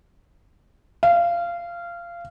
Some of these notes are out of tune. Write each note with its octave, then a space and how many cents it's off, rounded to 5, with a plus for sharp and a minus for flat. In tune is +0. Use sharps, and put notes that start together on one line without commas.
F5 -20